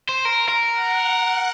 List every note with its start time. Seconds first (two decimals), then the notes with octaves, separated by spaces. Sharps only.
0.09 C5
0.25 A#4
0.49 A#4
0.73 F#5